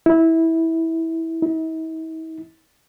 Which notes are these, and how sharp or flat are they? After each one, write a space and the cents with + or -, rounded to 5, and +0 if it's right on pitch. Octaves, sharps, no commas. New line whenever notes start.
E4 -15
E4 -45